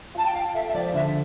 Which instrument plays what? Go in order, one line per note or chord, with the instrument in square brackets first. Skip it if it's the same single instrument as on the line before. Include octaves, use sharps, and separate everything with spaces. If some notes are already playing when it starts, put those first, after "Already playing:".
[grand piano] F4 [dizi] A5
[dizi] G5
[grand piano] F4 [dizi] F5
[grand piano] A4 [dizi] E5
[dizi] E5
[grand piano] F3 [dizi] D5
[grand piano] D3 [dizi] E5